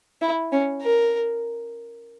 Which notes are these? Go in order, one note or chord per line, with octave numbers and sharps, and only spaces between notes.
E4
C#4
A#4